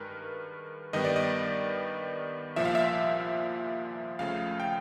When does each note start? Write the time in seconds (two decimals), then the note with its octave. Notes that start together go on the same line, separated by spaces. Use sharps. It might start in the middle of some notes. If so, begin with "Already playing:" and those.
Already playing: G2 D#3 G#3 A#4 B4
0.93 G2 D#3 G3 B3 D#5
1.05 D5
1.16 D#5
2.56 C2 A#2 F3 E5
2.65 F5
2.75 E5
4.19 C#2 C#3 F3 A3 F5
4.60 G5